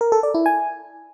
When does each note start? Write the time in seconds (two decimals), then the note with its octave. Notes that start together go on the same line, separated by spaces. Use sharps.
0.01 A#4
0.12 A4
0.23 D5
0.34 E4
0.46 G#5